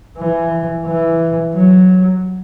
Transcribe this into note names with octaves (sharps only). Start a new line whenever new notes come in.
E3
E3
F#3